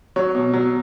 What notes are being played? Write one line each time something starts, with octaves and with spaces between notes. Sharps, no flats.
F#3 C#5
B2
F#3